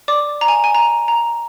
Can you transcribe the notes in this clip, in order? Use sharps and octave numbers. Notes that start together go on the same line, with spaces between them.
D5 D6
A#5
G#5
G#5
A#5
A#5